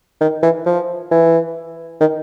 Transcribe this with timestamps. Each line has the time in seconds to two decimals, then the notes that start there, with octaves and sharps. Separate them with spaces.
0.21 D#3
0.43 E3
0.66 F3
1.11 E3
2.01 D#3